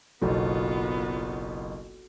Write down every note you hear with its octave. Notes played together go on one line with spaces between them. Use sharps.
F#1 B1 B3 F4 F#4 A4